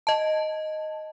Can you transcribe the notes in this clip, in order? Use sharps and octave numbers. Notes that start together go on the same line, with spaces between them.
D#5 A5